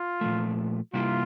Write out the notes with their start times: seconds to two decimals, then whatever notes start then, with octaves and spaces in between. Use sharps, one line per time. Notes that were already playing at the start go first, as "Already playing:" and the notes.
Already playing: F4
0.21 A#2 F3 A3
0.94 C3 G3 A#3 E4 F4 G4